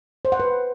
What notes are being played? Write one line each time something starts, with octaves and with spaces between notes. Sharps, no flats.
C5
F#5
B4